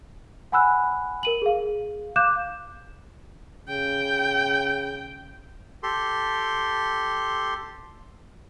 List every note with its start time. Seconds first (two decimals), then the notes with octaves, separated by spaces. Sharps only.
0.52 F#5 G#5 B5 E6 F#6
1.23 A#4 D#7 F#7
1.42 G#4 F5
2.16 F5 D6 F#6 G6 E7
3.68 C#3 G5
5.83 G4 A4 C6